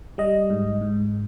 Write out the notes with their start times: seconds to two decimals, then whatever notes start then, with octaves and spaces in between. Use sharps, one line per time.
0.18 G3 D#5
0.50 G#2
0.82 G#2